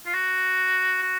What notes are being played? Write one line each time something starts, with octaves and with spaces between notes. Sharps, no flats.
F4
F#4
F#4